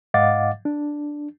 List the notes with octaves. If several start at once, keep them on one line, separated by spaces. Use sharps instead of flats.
G#2 D#5 F5 F#5 D6 A6
D4